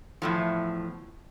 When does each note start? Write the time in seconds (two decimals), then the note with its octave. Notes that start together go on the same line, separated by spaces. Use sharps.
0.22 E2 A2 F3